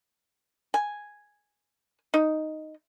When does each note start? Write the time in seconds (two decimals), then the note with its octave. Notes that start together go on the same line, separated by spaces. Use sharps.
0.74 G#5
2.14 D#4